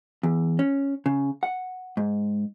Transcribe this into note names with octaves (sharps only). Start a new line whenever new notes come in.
E2
C#4
C#3
F#5
G#2